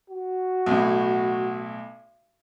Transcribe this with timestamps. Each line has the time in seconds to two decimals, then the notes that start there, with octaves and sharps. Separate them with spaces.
0.10 F#4
0.66 B1 A2